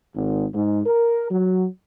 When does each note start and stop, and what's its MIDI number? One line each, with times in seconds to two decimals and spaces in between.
0.15 0.45 32
0.54 0.80 44
0.86 1.30 70
1.30 1.65 54